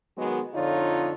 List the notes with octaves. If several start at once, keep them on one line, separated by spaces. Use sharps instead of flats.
D#3 F#3 G#3 B3 F#4 G#4
F2 D3 D4 D#4 F4 C#5